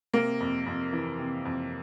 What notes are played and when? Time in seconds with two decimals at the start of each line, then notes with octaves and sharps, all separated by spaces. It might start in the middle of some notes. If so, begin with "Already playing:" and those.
0.14 C3 A#3
0.40 F2
0.66 F2
0.93 E3
1.19 C3
1.45 F2